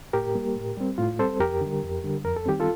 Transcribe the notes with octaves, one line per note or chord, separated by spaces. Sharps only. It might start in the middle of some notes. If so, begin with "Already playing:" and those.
A2 G4 A#4
G3 A#3
A2
G3 C4
A2 F4
G3 C4 A4 C5
F2 G4 A#4
D3 G3
F2
D3 G3
F2 A#4
A4
D#3 G3 C4 G4
F4 A4